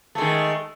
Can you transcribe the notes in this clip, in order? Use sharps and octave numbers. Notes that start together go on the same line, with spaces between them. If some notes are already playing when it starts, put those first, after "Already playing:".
D#3 G#3 A3